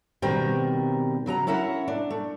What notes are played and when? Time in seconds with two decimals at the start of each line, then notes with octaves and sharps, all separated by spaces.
0.22 B2 D#3 G3 C4 A#4 G5
1.26 C#3 F#3 F#5 A#5
1.47 C#4 E4 A#4 E5 F#5
1.88 D4
2.10 A3